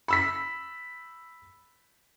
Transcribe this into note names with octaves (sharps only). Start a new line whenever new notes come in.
B5 E6 B6